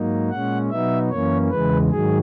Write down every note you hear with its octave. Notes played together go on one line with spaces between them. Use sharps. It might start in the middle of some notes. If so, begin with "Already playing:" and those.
Already playing: G#2 F#3 A#3 D#4
A#2 G#3 C#4 F#5
B2 F#3 B3 D#4 E5
F#2 E3 A#3 C#4 C#5
E2 C#3 E3 G#3 B4
G#2 D#3 F#3 G#4